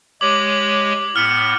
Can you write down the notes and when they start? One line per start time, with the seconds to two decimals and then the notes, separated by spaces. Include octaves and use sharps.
0.21 G#3 G4 C#5 D6 F#7
1.16 A2 B3 F6 C#7